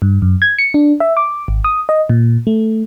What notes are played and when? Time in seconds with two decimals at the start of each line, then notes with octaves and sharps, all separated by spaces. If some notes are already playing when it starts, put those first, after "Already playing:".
0.02 G2
0.22 F#2
0.42 G#6
0.59 C#7
0.74 D4
1.00 E5
1.17 D6
1.48 G#1
1.64 D#6
1.89 D#5
2.09 A#2
2.47 A3